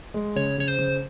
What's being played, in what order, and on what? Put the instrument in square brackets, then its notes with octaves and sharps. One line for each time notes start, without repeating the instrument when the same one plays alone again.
[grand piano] G#3
[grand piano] C#3 [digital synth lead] C#5
[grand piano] C#3 [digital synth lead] C#5
[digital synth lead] C5
[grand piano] C#3